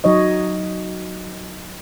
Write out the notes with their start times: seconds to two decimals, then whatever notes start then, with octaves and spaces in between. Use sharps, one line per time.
0.04 F#3 D#4 C#5 D#5